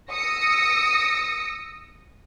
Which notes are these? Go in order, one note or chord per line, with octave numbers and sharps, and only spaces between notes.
D#6 E6 A#6 C#7